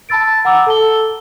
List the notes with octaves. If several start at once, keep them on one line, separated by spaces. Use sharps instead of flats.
A5 B5 E6 A6 D7
F#5 A#5 D6 E6
A4 A5 G7